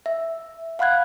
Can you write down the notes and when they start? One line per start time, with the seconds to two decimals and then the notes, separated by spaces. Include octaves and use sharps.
0.06 E5
0.79 F5 F#5 B5 F#6 G#6